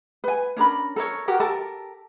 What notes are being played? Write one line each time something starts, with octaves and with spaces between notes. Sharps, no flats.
B4 G#5
C#4 D4 A#4 B5
A4 A#4 C#5
F#4 G4 A#4
G4 A4 A#4 A5